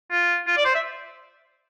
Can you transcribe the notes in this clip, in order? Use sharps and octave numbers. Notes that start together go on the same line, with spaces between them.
F4
F4
D5
C5
E5